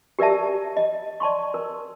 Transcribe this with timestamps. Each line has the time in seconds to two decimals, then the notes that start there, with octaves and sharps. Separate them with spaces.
0.19 G4 A#4 D5 E5 A5
0.77 D#5
1.20 D5 A5 C6 C#6
1.54 A#4